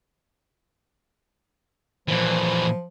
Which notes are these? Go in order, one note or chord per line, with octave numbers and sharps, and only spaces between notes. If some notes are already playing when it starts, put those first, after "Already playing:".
A#2 E3 F3